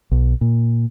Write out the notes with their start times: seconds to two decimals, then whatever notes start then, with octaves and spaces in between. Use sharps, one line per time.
0.11 B1
0.41 A#2